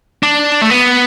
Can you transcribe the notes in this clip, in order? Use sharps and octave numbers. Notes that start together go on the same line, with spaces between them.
D4
A3
B3